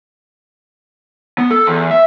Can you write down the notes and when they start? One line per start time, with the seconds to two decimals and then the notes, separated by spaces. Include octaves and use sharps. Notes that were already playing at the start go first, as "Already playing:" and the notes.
1.39 B3
1.51 A4
1.67 E2
1.91 E5